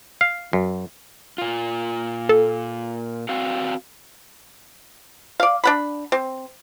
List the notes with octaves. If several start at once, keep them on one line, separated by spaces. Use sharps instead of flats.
F5
F#2
A#2 F4
A4
C4 F#4 F5
D5 F5
D4 F#5 B5
C4